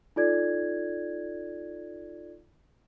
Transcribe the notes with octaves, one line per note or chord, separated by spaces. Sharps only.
D#4 F4 A4 D5 G#6